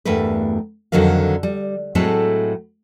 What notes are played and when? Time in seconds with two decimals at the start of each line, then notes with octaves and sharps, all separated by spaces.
0.05 E2 G2 A3 A#4 B4
0.92 F2 D3 D#3 F#3 A#4 F5
1.43 G3
1.95 A2 F#3 G#3 A3 C4 A4